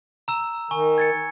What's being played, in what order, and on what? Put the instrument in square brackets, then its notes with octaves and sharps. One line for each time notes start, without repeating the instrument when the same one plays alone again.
[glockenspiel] A#5 E6 E7
[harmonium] D#3 [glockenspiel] G#5 C#6
[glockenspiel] G#6 A6 C#7